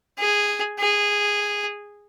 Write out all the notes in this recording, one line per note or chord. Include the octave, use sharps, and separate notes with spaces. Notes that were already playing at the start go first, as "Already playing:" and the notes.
G#4
G#4